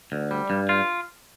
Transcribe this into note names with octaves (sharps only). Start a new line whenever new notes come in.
D2
G3
G2
F4